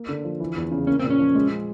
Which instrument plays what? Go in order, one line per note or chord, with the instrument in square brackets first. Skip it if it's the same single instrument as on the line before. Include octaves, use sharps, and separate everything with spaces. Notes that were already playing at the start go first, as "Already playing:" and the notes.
Already playing: [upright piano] A#3
D3
F3
E3
E2
C#3
[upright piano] A#3 [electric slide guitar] C#4
[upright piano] A#2 [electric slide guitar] C4
[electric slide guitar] C#4
[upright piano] F3
G#3